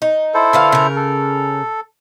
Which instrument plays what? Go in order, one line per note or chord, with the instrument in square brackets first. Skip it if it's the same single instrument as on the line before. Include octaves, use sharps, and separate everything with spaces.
[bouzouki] D#4
[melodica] E4 A4 C5
[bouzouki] D3 B4 F5
C#3 A#4
[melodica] A4